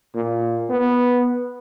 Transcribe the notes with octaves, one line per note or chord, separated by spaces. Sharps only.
A#2
B3